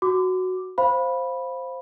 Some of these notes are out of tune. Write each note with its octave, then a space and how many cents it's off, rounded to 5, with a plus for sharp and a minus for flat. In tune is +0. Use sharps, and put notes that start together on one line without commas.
F#4 +0 D6 +0
C5 +5 F5 +0 B5 -10